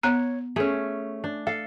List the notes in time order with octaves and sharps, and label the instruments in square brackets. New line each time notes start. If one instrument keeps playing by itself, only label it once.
[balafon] B3 A#5 [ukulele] C#5
[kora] A3 C#4 [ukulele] G#4
[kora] D4
[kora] A4 [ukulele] F5